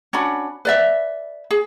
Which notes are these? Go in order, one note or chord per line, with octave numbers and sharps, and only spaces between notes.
C#4 D4 F#4 B5
B4 D5 E5
G#4